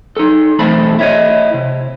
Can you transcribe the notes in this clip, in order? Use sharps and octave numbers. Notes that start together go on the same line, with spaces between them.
D#4 A4
B1 E2 A3 C4 A4 B5
E4 C#5 D#5
C3